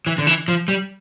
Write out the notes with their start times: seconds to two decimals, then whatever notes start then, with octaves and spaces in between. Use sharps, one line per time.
0.07 E3
0.18 D3
0.27 E3
0.48 F3
0.68 G3